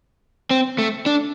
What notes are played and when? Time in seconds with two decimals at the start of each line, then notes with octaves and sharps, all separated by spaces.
0.51 C4
0.78 A3
1.06 D4